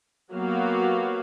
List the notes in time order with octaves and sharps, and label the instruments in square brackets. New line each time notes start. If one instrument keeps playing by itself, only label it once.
[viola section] F#3 A#3 B3 F#4 G4 F5